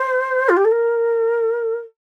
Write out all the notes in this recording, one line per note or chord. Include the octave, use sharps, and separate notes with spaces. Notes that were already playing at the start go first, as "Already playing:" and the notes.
Already playing: C5
F4
G4
A4
A#4